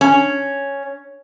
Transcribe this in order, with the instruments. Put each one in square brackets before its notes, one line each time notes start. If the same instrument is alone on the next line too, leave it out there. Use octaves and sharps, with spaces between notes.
[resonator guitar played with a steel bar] C#4